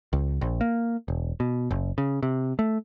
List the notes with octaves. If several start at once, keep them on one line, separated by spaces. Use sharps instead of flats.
C#2
A#1
A#3
E1
B2
F#1
C#3
C3
A3